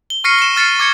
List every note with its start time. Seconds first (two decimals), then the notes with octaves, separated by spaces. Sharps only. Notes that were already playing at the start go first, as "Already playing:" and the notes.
0.10 G7
0.24 C#6 F6 A#6 C7 C#7 D#7
0.39 E7 G7
0.56 F6 A6 C7 C#7
0.80 D6 G#6 C#7